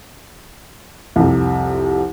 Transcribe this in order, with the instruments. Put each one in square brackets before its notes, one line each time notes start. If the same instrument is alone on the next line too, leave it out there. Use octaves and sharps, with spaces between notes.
[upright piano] C2 F2 C3